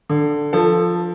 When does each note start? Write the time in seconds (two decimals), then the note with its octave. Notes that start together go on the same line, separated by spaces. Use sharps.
0.09 D3
0.53 F3 A4